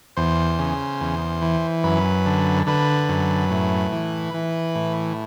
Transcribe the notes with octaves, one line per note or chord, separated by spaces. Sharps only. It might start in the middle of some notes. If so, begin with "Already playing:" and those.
E2 C5
C#3
E2
E3
F#2 B4
D3
D3 B4
F#2
A2
E3
E3
A2